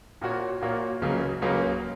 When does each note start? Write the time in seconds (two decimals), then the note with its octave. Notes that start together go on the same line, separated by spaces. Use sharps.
0.21 A#2 A#3 F#4 C#5
0.61 A#2 A#3 F#4 C#5
1.02 C#2 C#3 F#3 A#3
1.41 C#2 C#3 F#3 A#3